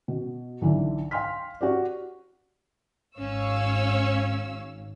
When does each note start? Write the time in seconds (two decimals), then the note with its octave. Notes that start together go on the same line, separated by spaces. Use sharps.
0.08 B2
0.61 B1 D3 E3
1.11 F5 G5 C6 F6 B6
1.61 F#4 G4 D5
3.19 G#1 C#4 C#5 F5 E6